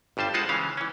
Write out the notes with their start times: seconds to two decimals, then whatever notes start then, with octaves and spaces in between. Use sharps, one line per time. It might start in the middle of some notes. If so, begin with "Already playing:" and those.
0.17 G1 G2 G3 C5 A5
0.34 G#3 D#4 F4 C5 F#5 A5
0.49 C#3 E3 G#3 C#4 F5
0.77 E3 C#4